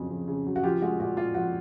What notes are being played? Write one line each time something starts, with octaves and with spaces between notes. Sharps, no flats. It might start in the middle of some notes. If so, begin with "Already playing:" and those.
Already playing: F2 C#3 F#3
F2
C#3
F#3
F#4
F3 F4 G4
G#3 F#4
A#2 F#4
A#2 F4
F3 F#4